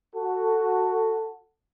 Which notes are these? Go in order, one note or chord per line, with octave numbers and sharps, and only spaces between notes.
F#4 A4